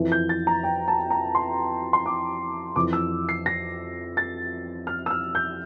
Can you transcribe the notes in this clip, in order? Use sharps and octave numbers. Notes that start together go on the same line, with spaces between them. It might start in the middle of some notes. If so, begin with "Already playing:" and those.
Already playing: F2 E3
G6
A6
A#5
G5
A5
A#5
C6
C6
D6
F2 E3 D6
E6
C7
A#6
A6
F6
E6
F6
G6